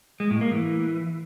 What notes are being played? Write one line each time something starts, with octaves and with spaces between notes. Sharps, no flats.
G#3
A2
A#3
E3